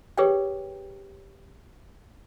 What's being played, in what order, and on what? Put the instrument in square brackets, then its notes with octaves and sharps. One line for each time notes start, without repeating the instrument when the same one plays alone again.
[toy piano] G4 G#4 B4 C#5 D5 G5